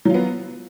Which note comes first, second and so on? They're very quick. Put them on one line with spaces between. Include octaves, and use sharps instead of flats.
F#3 F4 B3